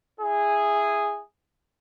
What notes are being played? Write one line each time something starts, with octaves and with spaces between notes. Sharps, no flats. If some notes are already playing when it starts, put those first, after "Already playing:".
E4 G#4